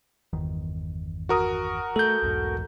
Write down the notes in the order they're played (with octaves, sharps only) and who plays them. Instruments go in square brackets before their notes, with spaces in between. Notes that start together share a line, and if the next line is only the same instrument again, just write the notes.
[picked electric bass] G1 E2 D#3
[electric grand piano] F#4 A#4 D#6
[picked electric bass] A3 [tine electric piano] A4 G6
[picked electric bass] B1 E2 G#2